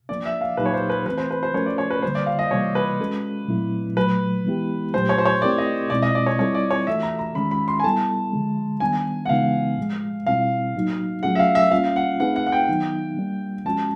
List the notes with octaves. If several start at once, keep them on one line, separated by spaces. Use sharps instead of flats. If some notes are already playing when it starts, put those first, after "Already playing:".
F3 A#3 D4 D5
E5
F5
A#2 F#3 A#3 D#4 G4 B4
C#5
C5
B4
E3 A3 C4 B4
C5
B4
C5
F3 A3 C#4 F#4 A#4 C#5
D5
C#5
B4
D3 G3 A#3 C5
D5
F5
D#5
C3 E3 G3 A#3 C#5
B4
G#3 C#4 F#4 A4
A#2 F#3 A3 C4 E4
A#2 F#3 A3 B4
E3 G#3 B3 E4 G4
A#2 F#3 A3 D4 G4 C5
C#5
C5
C#5
A3 C4 E4 G4 A#4 D5
D#5
B2 G#3 C4 E4 D5
D#5
D5
C#5
G3 C4 E4 A4 C#5
D5
C#5
E3 A3 D4 F#4 A4 E5
A#5
A#5
D#3 G#3 C#4 B5
B5
C6
G#5
G3 B3 E4 A4 A5
D3 F3 G#3
D#3 G3 B3 D4 G#5
F#5
C#3 E3 G#3 B3 D#4 F5
A2 F3 G#3
B2 G3 C4 E4 F5
A2 F#3 A#3 D#4 F#4
F#3 A3 C#4 F4 G#4 F#5
E5
F5
E5
G3 A#3 C#4 F4 F5
F#5
A3 C4 D#4 G#4 B4 F#5
F#5
F#5
G5
D#3 F#3 B3 D#4
G3 A#3 D4
F3 G#3 C#4 F#4 A5